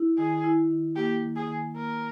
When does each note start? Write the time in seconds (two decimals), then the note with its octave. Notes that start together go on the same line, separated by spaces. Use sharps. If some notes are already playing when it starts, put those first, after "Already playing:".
Already playing: E4
0.18 D#3 G#4
0.44 E4
0.70 D#3
0.96 A#3 G4
1.23 D#3
1.36 G#4
1.49 D#3
1.75 A#3 A#4